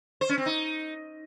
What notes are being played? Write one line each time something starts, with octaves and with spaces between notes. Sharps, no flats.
C5
C#4
C4
D#4